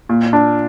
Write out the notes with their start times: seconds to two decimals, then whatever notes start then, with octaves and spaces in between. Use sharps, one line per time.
0.09 A#2
0.33 D4